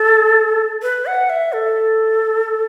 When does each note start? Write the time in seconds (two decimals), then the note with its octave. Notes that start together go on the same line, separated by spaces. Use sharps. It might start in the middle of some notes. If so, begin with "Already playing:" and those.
Already playing: A4
0.83 B4
1.06 F#5
1.30 E5
1.53 A4